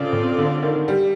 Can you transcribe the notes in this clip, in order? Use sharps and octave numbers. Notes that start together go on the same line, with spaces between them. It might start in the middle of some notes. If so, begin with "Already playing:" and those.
Already playing: C#3 C4 F4 A4 D5
C#3
D3
D#3
G3